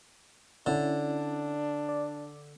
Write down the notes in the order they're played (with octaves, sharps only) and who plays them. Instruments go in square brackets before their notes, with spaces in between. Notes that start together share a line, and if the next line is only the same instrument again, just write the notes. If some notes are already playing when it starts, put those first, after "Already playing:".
[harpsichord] D3 [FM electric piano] C#4 E4 [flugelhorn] D4
[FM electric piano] D5